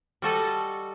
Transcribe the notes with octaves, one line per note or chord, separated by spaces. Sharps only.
G3 F#4 A4 D#5